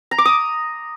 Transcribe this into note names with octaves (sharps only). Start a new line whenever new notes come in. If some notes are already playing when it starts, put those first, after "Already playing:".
A#5
D6
D#6